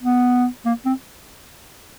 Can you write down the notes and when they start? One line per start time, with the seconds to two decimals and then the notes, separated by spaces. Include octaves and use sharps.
0.03 B3
0.65 A#3
0.85 C4